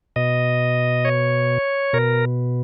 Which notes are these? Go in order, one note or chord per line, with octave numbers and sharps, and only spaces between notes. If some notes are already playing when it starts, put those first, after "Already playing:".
B2 D#5
C#5
B2 A#4